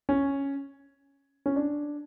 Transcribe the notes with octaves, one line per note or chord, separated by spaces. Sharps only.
C#4
C#4
D4